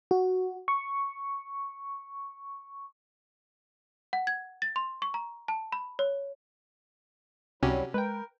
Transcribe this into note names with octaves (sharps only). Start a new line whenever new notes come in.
F#4
C#6
F#5
G#6
A6
C6
C#6
A#5
A5
B5
C#5
C#2 C3 F#3 G3 C#4 E4 F#4 G4
G#3 A#4 B4 G5